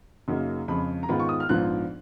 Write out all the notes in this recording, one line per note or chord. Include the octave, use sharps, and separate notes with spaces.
F#2 C#3 F#3 A#3 D#4
F2 C#3 G#3 B5
A#5
G#2 D#3 G#3 B3 F4 B5
C#6
D#6
F6
A#1 G#2 F3 B3 F4 F#6